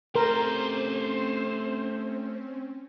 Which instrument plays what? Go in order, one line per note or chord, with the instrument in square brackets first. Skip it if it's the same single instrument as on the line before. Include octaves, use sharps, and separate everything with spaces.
[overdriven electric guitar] A3 G4 [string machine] C4 C#4 [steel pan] A#4 [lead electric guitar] C5